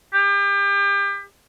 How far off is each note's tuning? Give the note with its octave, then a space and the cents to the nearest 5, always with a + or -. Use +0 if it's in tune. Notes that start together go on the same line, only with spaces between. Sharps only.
G4 +35